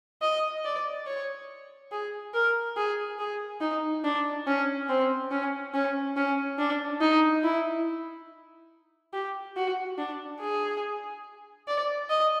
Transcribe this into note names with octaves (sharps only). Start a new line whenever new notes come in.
D#5
D5
C#5
G#4
A#4
G#4
G#4
D#4
D4
C#4
C4
C#4
C#4
C#4
D4
D#4
E4
G4
F#4
D4
G#4
D5
D#5